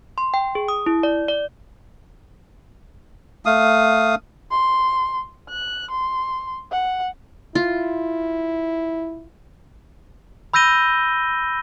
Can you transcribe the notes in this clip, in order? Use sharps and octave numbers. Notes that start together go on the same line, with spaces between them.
C6
G5
G#4
D#6
E4
D5
D5
A3 F5 D#6
C6
F#6
C6
F#5
E4 F4
B5 E6 G6 A#6 D#7 G7